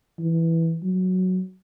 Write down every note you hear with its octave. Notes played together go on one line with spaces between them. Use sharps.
E3
F#3